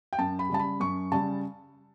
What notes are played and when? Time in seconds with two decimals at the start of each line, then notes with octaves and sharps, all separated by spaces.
0.13 G5
0.19 F#2 A5
0.39 B5
0.49 C#3 G3 A5
0.59 B5
0.80 F#2 C#6
1.12 C#3 G3 A5